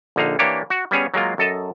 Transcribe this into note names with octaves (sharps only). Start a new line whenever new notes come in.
A#1 D3 D#4 F5
E3 A#3 D4 G4 C#5
F#4
G3 B3 C#4 G#4 C#5
F#3 G#3 A#3 F4
F#2 A4 D#5 A5